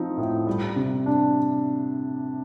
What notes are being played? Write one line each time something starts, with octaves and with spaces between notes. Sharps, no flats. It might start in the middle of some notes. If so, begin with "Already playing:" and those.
Already playing: F3 C4 D#4
A2
G3
C3
D4